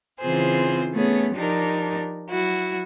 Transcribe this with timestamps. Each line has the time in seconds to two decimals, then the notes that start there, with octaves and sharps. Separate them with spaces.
0.20 C#3 E3 C4 F4 G#4 C5
0.93 A3 B3 C#4 G#4 C#5
1.34 F3 D4 D#4 G4 A#4
2.29 F#3 E4 F#4